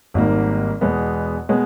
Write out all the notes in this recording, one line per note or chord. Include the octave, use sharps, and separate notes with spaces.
G#1 G#2 D#3 G3 A#3
E2 B2 G#3 B3
B2 G#3 B3